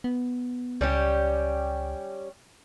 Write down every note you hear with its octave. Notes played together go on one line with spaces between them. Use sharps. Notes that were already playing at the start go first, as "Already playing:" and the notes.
B3
C#2 G3 C#4 G4